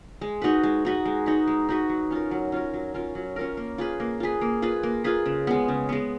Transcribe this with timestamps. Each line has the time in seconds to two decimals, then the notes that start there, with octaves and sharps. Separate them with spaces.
0.21 G#3
0.42 D#4 F#4 B4
0.63 G#3
0.85 D#4 F#4 B4
1.05 G#3
1.26 D#4 F#4 B4
1.47 G#3
1.69 D#4 F#4 B4
1.89 F#3
2.11 C#4 F4 A#4
2.31 F#3
2.52 C#4 F4 A#4
2.74 F#3
2.94 C#4 F4 A#4
3.15 F#3
3.36 C#4 F4 A#4
3.57 A#3
3.78 F4 G#4 B4
4.00 A#3
4.20 F4 G#4 B4
4.41 A#3
4.62 F4 G#4 B4
4.83 A#3
5.04 F4 G#4 B4
5.26 C#3
5.47 G#3 B3
5.68 C#3
5.89 G#3 B3